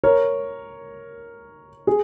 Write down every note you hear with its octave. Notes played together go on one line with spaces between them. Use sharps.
A#4 C#5
G#4